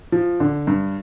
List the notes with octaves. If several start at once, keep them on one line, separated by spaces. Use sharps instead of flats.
F3
D3
G2